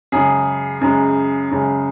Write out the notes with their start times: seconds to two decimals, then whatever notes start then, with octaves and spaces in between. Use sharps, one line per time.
0.12 F#2 C#3 G#3 G#4
0.81 F#2 C#3 G#3
1.51 F#2 C#3 G#3